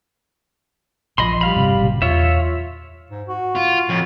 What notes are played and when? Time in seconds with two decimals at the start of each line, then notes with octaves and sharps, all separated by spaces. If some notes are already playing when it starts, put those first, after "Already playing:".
1.18 A#1 F3 D#5 B5 C6
1.41 G3 F5 B5
1.56 G1 C3
1.81 A#2 C#3 F#3
2.02 E2 F4 C#5 E5
3.11 G#2
3.28 F#4
3.55 F4
3.89 F2 A2